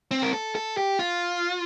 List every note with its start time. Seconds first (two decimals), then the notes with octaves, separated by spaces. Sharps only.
0.11 C4
0.23 A#4
0.33 A4
0.55 A4
0.77 G4
0.99 F4